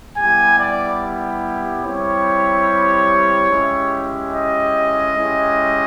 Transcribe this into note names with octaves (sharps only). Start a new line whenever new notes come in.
G3 B3 E4 G4 G#5
D5
G3 C4 E4 G4 C#5
G#3 C#4 E4 G4
D#5
G#3 C#4 E4 G4